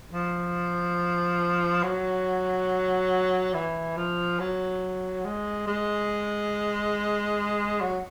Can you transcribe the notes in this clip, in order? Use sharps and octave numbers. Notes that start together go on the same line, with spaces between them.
F3
F#3
E3
F3
F#3
G#3
G#3
F#3